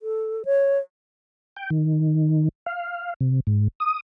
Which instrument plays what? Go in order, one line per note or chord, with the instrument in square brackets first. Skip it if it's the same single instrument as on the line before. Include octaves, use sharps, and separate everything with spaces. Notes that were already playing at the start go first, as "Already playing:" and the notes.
[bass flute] A4
C#5
[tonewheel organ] G5
D#3
F5
C3
G#2
D#6